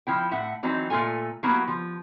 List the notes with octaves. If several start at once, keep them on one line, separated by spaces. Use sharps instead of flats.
F3 E4 G5
A2 E5 F#5
E3 F#3 C4 D#4
A#2 A3 F4 A4 G#5
F#3 A#3 B3 E4 F#4 G4
F3